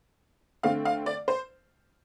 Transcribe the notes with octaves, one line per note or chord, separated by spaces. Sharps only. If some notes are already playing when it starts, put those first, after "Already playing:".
D3 A3 C4 F5
F5
D5
C5